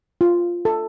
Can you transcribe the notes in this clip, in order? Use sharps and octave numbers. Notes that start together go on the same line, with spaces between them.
F4
A4